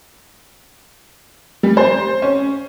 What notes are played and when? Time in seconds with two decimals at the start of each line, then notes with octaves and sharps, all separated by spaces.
1.63 G3
1.77 C5
2.22 C#4